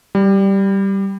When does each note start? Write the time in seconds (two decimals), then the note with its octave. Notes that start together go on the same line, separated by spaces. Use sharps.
0.15 G3